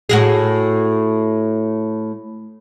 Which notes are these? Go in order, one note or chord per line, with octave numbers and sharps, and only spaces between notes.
A2 F#4 G#4